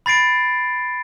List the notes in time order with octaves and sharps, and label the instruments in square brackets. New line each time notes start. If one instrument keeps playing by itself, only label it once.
[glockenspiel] B5 A6 C7 D7